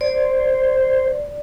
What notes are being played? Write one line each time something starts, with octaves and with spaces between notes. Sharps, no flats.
C5 D5